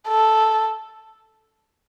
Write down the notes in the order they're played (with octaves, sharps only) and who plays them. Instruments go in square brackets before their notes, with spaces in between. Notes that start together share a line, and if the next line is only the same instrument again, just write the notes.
[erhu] A4